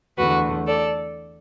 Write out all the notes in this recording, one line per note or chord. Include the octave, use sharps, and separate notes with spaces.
E2 D3 A3 F#4 B4
A4 D5